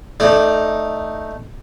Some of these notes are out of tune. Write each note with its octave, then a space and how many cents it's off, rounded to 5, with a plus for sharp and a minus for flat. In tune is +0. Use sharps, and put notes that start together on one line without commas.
A3 +0 D#4 +0 D5 +20